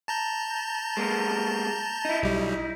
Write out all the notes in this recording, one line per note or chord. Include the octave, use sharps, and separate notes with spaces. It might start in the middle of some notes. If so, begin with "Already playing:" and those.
A5 A#5 G6
G#3 A#3 B3
D#4 E4
B1 G3